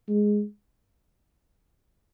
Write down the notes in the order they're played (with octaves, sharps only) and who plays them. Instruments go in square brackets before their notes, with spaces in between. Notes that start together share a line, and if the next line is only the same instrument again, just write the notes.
[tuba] G#3